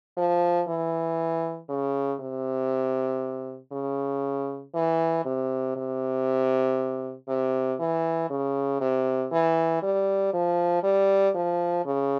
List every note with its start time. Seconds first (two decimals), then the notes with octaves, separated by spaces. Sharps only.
0.17 F3
0.68 E3
1.69 C#3
2.20 C3
3.72 C#3
4.74 E3
5.25 C3
5.76 C3
7.28 C3
7.79 E3
8.30 C#3
8.81 C3
9.32 E3
9.82 G3
10.33 F3
10.83 G3
11.35 F3
11.85 C#3